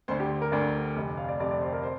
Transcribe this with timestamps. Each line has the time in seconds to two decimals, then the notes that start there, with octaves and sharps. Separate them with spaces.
0.08 D2 D3 C5
0.20 G4
0.42 A#4
0.52 D2 D3 D5
0.96 F1 F2 C3
1.17 F5
1.28 D5
1.39 F1 F2 C3 D5
1.51 D5
1.62 C5
1.72 A#4
1.83 C5